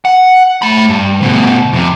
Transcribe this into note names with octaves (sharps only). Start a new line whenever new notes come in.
F#5
A3 B5
G2
D2 B2
F2 C3